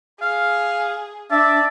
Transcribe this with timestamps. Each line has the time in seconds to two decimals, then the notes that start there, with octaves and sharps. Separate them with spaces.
0.21 G#4 F5
1.31 D4 D5 E5 A5